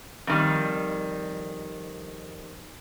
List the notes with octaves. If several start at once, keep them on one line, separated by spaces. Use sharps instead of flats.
F2 D#3 G3